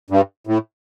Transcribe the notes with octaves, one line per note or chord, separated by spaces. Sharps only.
G2
A2